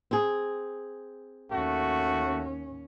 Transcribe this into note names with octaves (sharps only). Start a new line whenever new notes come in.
C4 G#4
D#2 A3 C#4 F#4